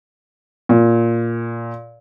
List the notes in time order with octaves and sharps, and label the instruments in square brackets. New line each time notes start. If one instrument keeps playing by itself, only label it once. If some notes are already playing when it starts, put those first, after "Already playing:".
[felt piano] A#2